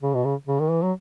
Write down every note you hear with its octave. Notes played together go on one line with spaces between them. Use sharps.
C#3
B2
C#3
C#3
D#3
E3
F#3